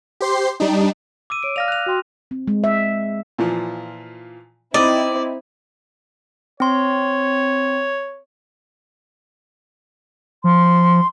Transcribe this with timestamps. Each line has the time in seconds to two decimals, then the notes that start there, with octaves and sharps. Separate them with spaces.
0.21 G4 C5 C6 C7
0.60 G3 D4 D#4
1.30 D6 E6 D#7
1.43 C#5 D7
1.56 D5 F5 F6 A#6 F7
1.68 F#6 F7
1.86 F#4 G5 C6
2.31 C4
2.48 G#3
2.64 E5
3.38 A#2 E3 F3
4.74 C4 D#4 E4 D5 D#5
6.60 C4 C#5 C6
10.44 F3 C6